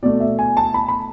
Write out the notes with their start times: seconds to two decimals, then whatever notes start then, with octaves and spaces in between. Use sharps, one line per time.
0.02 B2 A3 D5
0.20 E5
0.39 G#5
0.57 A5
0.74 B5
0.89 B5